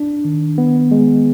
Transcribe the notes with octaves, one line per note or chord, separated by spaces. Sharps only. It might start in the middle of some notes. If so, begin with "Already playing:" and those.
Already playing: D4
D#3
B3
G#3